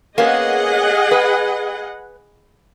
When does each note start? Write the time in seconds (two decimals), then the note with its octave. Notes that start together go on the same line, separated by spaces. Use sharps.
0.18 A#3 B3 C#4 G#4 D#5 F#5
1.11 B4